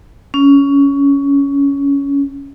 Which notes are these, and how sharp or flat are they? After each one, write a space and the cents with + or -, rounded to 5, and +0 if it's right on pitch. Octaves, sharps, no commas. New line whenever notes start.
C#4 +15